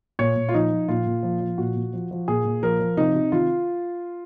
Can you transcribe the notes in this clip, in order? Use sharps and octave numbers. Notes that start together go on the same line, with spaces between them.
A#2 C#5
A#2
F4
F3 D#4
F3
A#2 F4
A#2
F3
F3
A#2 F#4
A#2
F3
F3
A#2 G#4
A#2
F3 A#4
F3
C3 D#4
C3
D#3 F4